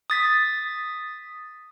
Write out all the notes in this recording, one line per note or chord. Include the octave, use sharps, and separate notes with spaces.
D#6 A6 B6